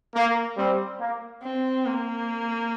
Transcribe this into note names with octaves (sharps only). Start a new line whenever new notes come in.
A#3
G3 C4
A#3
C4
A#3